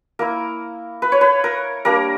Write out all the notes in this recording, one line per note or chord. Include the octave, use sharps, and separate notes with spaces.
A#3 E4 A#4
B4
C#5
B4
A#4
G3 A#3 D4 A#4